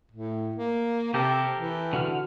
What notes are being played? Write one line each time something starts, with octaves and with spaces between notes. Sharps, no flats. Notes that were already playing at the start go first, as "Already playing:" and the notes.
A2
A#3
C3 G4 A4 A#4
E3
D3 F#4 F6